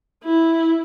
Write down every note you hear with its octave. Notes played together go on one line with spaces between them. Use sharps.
E4